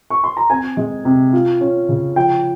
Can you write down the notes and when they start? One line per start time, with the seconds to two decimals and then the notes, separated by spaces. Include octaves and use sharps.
0.10 C#6
0.24 C6
0.37 A#5
0.50 C4 G#5
0.77 G#3
1.05 C3
1.33 F4
1.61 C#4
1.89 C#3
2.16 F3 G5